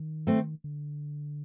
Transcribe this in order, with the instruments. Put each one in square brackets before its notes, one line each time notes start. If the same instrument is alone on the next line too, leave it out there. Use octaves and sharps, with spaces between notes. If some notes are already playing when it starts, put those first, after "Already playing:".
Already playing: [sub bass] D#3
[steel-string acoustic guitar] A3 C4
[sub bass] D3